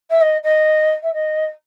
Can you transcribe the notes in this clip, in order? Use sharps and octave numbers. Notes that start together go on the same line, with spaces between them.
E5
D#5
D#5
E5
D#5